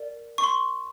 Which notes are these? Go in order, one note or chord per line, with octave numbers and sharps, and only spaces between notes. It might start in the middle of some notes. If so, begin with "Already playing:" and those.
Already playing: A#4 D5
C#6
C6